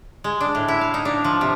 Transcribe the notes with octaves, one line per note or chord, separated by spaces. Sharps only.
G#3
D4
A2
E4
F5
D#4
D4
F3
C3